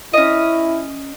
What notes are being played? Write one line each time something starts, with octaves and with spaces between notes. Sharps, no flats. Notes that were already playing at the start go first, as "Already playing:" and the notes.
C#4 E4 D#5